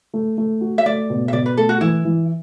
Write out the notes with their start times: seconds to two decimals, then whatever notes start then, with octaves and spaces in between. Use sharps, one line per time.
0.14 A3
0.38 A3
0.61 F#4
0.78 E5
0.86 A3 D5
1.10 B2
1.28 E5
1.33 B2 D5
1.46 B4
1.57 A3 A4
1.69 F#4
1.81 E3 E4
2.05 E3